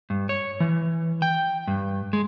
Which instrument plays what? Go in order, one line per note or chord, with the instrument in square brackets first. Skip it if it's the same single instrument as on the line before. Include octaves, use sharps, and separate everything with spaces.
[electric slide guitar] G2
C#5
E3
G5
G2
G#3